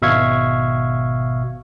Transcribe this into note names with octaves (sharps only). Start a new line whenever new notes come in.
G#1 B2 E5 F5 C#6 G#6